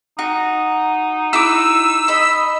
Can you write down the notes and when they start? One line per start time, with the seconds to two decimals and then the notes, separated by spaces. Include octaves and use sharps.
0.19 D#4 F#4
1.33 E4 F#4 D6 E6
2.08 D#5 B5